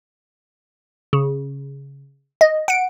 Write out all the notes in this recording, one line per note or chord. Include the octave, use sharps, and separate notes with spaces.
C#3
D#5
F#5 D7